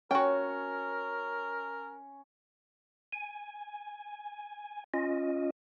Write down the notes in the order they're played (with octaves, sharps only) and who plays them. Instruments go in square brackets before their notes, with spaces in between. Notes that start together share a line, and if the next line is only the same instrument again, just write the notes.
[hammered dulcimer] C#4 [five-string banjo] F#4 G5 [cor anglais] A#4
[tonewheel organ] G#5
C#4 F4 D#5